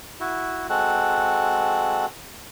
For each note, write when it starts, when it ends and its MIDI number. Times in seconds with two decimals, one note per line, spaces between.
0.20 0.67 64
0.20 0.67 66
0.70 2.06 56
0.70 2.06 60
0.70 2.06 66
0.70 2.06 69
0.70 2.06 78